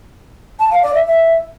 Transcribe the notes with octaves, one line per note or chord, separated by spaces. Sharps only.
A5
F5
D5
E5
E5